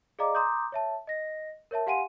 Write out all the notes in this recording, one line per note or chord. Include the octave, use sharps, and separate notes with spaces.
G#4 D5 D#5 F5 A#5 D6
A#5 C6 D6 D#6 G6
C#5 E5 A5
D#5 A#6
A#4 C#5 E5 A5
G4 F5 F#5 G#5 C6 D#7